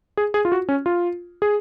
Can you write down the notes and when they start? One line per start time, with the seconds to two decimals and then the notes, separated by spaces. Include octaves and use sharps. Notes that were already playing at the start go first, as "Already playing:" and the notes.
0.17 G#4
0.34 G#4
0.45 F4
0.52 F#4
0.69 C#4
0.86 F4
1.42 G#4